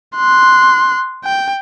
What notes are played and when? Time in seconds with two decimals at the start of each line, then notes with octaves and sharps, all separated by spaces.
0.16 C6 F#6
1.25 G5